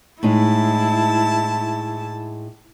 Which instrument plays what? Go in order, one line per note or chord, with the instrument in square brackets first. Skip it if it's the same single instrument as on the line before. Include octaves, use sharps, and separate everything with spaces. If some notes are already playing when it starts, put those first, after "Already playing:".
[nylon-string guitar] A2 G#3 D#4 [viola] E4 A5